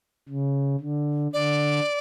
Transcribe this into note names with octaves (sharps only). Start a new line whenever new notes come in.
C#3
D3
D3 D5